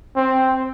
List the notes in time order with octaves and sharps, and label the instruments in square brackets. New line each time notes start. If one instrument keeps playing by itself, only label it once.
[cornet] C4